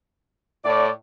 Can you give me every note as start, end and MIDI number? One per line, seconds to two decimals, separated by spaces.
0.65 0.89 45
0.65 0.90 74